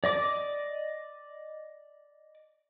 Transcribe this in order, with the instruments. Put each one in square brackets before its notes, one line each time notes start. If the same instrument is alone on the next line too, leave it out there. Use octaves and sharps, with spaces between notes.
[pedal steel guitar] D5 D#5 D6